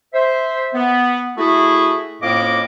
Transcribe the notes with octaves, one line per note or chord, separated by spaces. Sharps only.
C5 E5
B3
A3 E4 F#4 G#4
F2 A2 A#3 C#4 D#5 D6